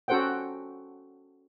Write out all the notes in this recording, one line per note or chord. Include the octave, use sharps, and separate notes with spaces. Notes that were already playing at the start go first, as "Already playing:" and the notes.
C#4 F#4 A4 C5 F#5 G5